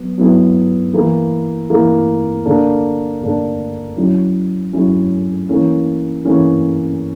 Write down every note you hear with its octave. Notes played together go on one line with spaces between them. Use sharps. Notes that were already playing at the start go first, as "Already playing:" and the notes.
Already playing: F#3 B3
F#3 B3 E4
E3 A#3 E4
E3 A#3 E4
D3 A#3 D4
D3 A#3 D4
F#3 C#4 E4
F#3 C#4 E4
E3 A#3 C#4
E3 A#3 C#4